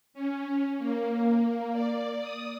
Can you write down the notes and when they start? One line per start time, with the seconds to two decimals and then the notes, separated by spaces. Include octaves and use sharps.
0.14 C#4
0.79 A#3
1.72 D5
2.20 D#6